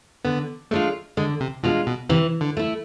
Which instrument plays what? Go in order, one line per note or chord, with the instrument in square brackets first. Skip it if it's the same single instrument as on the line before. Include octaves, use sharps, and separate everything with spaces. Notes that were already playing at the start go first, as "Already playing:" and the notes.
[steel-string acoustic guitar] D3 [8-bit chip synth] B3
[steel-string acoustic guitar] G#3 D4 F4 [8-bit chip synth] A3
[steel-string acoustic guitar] D3 [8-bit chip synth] G#3
[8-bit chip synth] C3
[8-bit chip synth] B2 [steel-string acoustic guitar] G#3 D4 F4
[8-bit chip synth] B2
[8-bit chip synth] C3 [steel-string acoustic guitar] E3
[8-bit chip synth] D3
[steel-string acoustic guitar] A3 E4